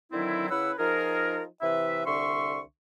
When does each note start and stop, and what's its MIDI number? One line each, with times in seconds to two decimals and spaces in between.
0.12 0.48 50
0.12 0.48 51
0.12 0.48 54
0.12 0.48 60
0.12 0.48 64
0.50 0.72 49
0.50 0.72 61
0.50 0.72 64
0.50 0.72 71
0.50 0.72 78
0.50 0.72 88
0.78 1.43 53
0.78 1.43 63
0.78 1.43 65
0.78 1.43 68
0.78 1.43 70
1.62 2.04 48
1.62 2.04 52
1.62 2.04 71
1.62 2.04 76
2.06 2.60 36
2.06 2.60 50
2.06 2.60 76
2.06 2.60 84
2.06 2.60 85